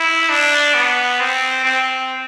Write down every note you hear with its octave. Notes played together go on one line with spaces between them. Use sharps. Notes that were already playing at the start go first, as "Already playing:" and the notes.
Already playing: E4
D4
B3
C4
C4